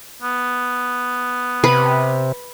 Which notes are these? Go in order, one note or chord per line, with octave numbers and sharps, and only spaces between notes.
B3
C3 B4